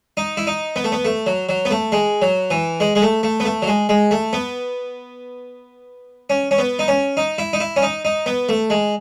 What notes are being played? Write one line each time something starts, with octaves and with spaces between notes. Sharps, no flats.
D#4
E4
D#4
B3
A3
B3
A3
F#3
F#3
B3
A3
G#3
F#3
E3
G#3
G#3
A3
A3
B3
A3
F#3
G#3
G#3
A3
B3
C#4
C#4
B3
D#4
C#4
D#4
E4
D#4
E4
C#4
D#4
D#4
B3
A3
G#3